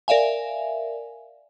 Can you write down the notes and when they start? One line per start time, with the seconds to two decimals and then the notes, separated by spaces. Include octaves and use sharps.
0.08 A#4 D5 E5 F5 G#5